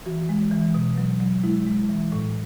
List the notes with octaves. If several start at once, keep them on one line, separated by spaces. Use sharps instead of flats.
E3 F#4
G#3
E3
B2
F#3
F#3
G#3 E4
G#3
E3
A2